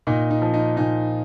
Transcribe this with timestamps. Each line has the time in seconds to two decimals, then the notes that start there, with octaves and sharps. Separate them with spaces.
0.07 A#2 D#4
0.31 D#4
0.42 F3
0.54 D#4
0.77 A#2 D#4